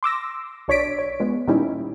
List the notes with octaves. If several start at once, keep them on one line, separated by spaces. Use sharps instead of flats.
C6 D6 E6 A#6
B1 D4 C#5 D5 B6 D7
C#5
F3 G#3 B3
A#2 D#3 G3 C#4 D#4 E4